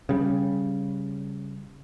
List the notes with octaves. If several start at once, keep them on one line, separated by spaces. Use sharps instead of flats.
C#3 G3